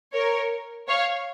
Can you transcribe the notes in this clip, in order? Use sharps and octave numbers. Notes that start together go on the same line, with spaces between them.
A#4 C#5
C#5 F5